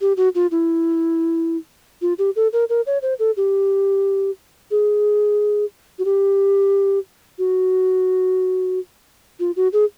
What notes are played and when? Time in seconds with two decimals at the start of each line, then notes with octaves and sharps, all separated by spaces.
0.01 G4
0.17 F#4
0.35 F4
0.51 E4
2.02 F4
2.18 G4
2.36 A4
2.53 A#4
2.69 A#4
2.86 C#5
3.02 C5
3.19 A4
3.37 G4
4.71 G#4
5.99 F#4
6.05 G4
7.38 F#4
9.40 F4
9.56 F#4
9.73 G#4